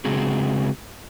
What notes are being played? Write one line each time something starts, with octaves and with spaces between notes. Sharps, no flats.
C#3 G#3 C4 F#4 G#4